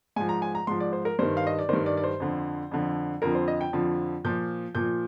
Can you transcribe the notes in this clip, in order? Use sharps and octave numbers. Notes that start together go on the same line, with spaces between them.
G#2 F3 G#5
A#5
G#5
A#5
G#2 F3 C6
D5
C5
A#4
G2 D#3 C5
F5
D#5
D5
G2 D#3 C5
D5
D5
C5
F2 D3 F3
F2 D3 F3
F2 D3 F3 A#4
C5
D#5
G5
F2 D3 F3
A#2 F3 G6
A#2 F3 G6